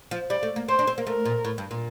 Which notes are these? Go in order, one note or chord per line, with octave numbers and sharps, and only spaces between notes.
F3
G3 D5
A3
A#3
C4 C5
D4
C4
A#3
A3 A#4
A#2
A2
G2
A#2